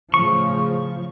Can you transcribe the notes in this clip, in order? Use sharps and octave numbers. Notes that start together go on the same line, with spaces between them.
A2 C#3 F3 C#6